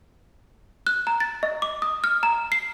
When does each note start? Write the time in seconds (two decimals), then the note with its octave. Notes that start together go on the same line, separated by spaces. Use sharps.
0.87 F#6
1.07 A#5
1.20 A6
1.43 D#5
1.62 D6
1.82 D#6
2.04 F6
2.23 A#5
2.52 C7